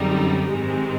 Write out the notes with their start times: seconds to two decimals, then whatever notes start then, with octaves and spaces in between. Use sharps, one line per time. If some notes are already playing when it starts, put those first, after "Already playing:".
Already playing: F#2 D3 G3 C4 D#4 G#4
0.11 G4
0.51 G#2 D#3 G#3 C4 G4